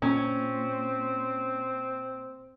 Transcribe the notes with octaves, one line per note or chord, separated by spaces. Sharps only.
A#2 C4 C#4